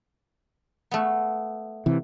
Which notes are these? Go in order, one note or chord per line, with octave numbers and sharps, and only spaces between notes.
A3 B3
C3 E3